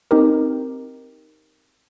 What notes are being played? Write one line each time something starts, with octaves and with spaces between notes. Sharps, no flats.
C4 D#4 G4 A#4